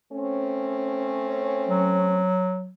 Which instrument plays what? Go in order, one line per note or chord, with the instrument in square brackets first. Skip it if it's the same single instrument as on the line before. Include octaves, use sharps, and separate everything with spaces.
[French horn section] A3 C4 C#4
[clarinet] F#3